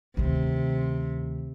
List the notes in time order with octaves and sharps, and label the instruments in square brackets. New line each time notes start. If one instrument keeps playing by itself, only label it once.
[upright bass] D2 D#3 [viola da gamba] C3